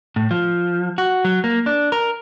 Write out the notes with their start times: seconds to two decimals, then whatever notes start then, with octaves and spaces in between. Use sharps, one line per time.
0.16 A2
0.31 F3
0.98 F#4
1.25 F#3
1.44 A#3
1.66 D4
1.92 A#4